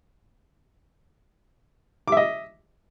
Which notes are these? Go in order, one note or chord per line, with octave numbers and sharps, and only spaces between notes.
D#5 E5 D6